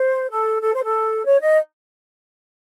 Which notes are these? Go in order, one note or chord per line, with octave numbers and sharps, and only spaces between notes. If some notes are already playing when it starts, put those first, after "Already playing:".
Already playing: C5
A4
A4
C5
A4
C#5
D#5